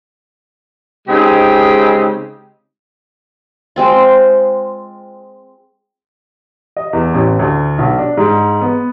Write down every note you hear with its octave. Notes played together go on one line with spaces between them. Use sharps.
C#3 G#3 C4 D#4 G4
G#3 C4 F4
D#5
E2
A1
D2
B1
D4
G#2
B3